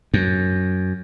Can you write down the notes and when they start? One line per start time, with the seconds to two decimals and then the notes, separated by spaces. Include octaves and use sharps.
0.14 F#2